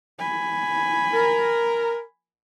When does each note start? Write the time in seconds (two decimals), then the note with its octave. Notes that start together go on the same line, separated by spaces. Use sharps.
0.19 G#5 B5
1.14 A#4